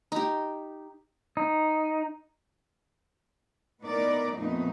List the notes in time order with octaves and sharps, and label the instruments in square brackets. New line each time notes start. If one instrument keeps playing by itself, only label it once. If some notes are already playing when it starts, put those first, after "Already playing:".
[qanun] D#4 G4
[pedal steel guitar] D#4
[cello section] A2 B3 D#4 A#4 D5
F2 A#2 A3 B3 D#4